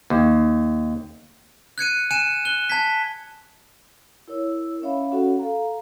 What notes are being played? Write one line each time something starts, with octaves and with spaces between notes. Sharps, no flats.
D#2
F#6 G#6 C#7 D#7
G#5 F#6 C#7 D#7 E7
F#6 G7
A5 G#6 B6
E4 A#4 C#5 E6
C#4 C#5 E5 F5 B5
C#4 F#4 A4 F#5
A4 F5 A#5